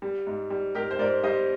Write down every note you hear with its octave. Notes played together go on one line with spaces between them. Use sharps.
G3
G#2
G3
G#2 G4 A#4
C5
G#2 A#4 D5
G3 C5 D#5